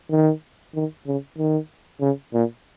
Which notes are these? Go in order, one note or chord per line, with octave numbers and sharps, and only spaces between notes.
D#3
D#3
C#3
D#3
C#3
A#2